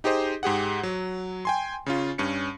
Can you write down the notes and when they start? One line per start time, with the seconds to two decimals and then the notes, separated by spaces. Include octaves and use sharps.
0.04 D#4 G4 G#4 C5 D#5
0.43 G#2 G4 G#4 F#5
0.83 F#3
1.45 G5 G#5 C6
1.86 C#3 C#4 F4
2.18 G2 C#4 C#7